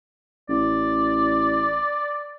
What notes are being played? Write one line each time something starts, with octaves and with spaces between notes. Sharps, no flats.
A1 D5